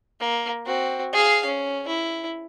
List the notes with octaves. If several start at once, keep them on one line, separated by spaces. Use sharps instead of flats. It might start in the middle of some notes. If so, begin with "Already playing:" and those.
A#3
C4 F#4
G#4 F5
C#4
E4